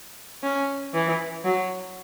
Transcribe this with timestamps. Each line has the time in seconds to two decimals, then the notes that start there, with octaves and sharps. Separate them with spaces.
0.43 C#4
0.94 E3
1.45 F#3